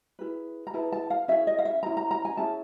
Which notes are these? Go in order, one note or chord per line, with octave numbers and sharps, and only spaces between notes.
E4 G#4 B4
A#5
E4 G#4 B4 A5
A5
F5
C#4 E4 G#4 E5
D#5
F5
E5
C#4 E4 G#4 A#5
A#5
A#5
G#5
C#4 E4 G#4 A5